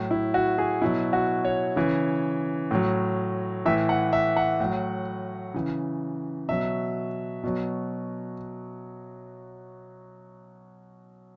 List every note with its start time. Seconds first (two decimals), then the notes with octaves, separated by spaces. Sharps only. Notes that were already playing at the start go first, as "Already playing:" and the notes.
Already playing: A2 F#3
0.11 E4
0.34 F#4
0.58 G#4
0.82 B2 F#3 E4
1.13 F#4
1.45 C#5
1.76 C#3 E3
2.71 A2 F#3
3.66 A2 E3 E5
3.89 F#5
4.13 E5
4.37 F#5
4.60 A2 F#3
5.54 C#3 E3
6.49 B2 F#3 E5
7.43 B2 F#3